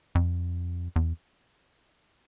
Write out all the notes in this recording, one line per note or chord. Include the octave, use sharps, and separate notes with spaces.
F2
E2